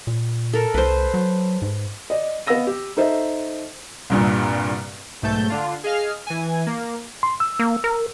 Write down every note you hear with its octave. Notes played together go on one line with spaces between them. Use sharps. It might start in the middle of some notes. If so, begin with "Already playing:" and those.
A#2
A4 A#4
C2 B4 C5
F#3
G#2
D5 D#5
B3 D#5 F5 E6 A#6 D#7
G4
D#4 A4 C5 D#5 E5
C2 G2 A#2
B1 G#2 A3 A5 G6
D3 D4 F4
G#4 D#5 F5 F6
E3 G#5
A#3
C6
E6
A#3
A#4